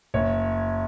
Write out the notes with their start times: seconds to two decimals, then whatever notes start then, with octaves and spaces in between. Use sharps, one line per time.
0.14 F#1 C#5